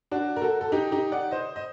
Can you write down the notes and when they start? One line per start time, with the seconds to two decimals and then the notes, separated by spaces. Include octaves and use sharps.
0.11 D4 F#4
0.36 A#4
0.42 F#4 A4
0.61 A4
0.72 D#4 G4
0.92 D#4 G4
1.12 D5 F#5
1.31 C5 D#5
1.56 D#5